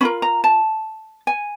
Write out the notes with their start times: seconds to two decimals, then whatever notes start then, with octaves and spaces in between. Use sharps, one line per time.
0.01 C#4 F4 A#4 B5
0.22 A#5
0.44 A5
1.27 G#5